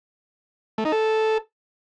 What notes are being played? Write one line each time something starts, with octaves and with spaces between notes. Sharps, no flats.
A3
D#4
A4